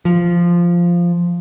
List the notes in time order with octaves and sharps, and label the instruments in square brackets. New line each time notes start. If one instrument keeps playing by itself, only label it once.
[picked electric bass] F3